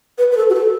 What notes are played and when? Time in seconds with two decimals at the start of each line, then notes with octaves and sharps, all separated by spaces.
0.18 B4
0.32 B4
0.37 A4
0.50 F#4
0.54 A4